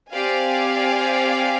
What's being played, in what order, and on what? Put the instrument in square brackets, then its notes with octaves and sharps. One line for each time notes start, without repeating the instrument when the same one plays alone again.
[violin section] C4 G4 D5 F5 G#5